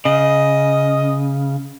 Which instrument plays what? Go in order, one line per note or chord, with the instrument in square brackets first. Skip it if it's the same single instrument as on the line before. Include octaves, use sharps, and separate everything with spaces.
[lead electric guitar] C#3 [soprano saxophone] D#5